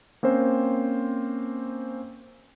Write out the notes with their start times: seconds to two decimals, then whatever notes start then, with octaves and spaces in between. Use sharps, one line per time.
0.23 A#3 C4 C#4 C5